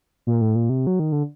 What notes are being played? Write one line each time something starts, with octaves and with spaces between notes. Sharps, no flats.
A#2
A2
A#2
C3
F#3
D#3
D3